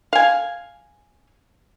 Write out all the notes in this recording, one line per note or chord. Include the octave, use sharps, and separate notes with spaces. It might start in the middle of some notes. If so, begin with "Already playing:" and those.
F5 G#5